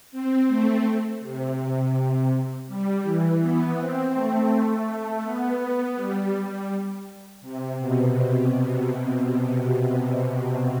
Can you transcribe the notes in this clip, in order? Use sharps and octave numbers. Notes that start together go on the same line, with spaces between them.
C4
A3
C3
G3
E3
B3
C4
A3
A3
B3
B3
G3
G3
C3
B2